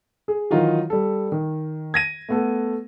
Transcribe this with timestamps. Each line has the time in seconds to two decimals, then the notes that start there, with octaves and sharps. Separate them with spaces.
0.28 G#4
0.51 D#3 E3 F#3 D#4 F4 F#4
0.90 G3 A4
1.32 D#3
1.94 G#6 A#6 D#7
2.29 A3 B3 A4